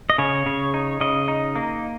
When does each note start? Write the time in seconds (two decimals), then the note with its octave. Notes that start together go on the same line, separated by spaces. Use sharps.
0.10 D#5
0.18 C#3 C#5
0.46 C#3
0.74 D#4
1.01 C#3 D#5
1.28 D#4
1.56 A#3